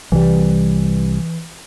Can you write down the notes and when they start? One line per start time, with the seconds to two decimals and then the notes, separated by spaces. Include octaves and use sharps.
0.12 C2 E3 G3